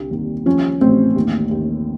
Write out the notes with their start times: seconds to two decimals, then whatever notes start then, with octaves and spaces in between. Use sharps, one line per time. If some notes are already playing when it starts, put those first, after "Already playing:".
Already playing: C2 D3
0.11 D#2
0.46 F3 C#4
0.81 A1 C4
1.16 D#2
1.51 D#2